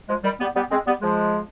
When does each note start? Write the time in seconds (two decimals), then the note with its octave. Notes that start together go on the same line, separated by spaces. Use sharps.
0.09 F3 G#3
0.24 D#3 G3
0.40 G3 B3
0.55 G3 B3
0.71 G#3 C4
0.86 G3 B3
1.01 F3 G#3